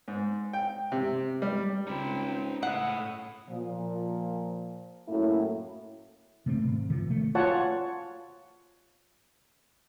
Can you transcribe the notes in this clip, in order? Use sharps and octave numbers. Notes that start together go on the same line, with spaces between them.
G#2
G5
C3
G3
C#2 C4 D#4 G5 B5
A2 F#5 D#6
A#2 F3
F#2 A2 F#3 A3 A#3 E4
C3 A3 C4
G#1
C3 D#3 F3
A3
F4 C#5 F#5 A5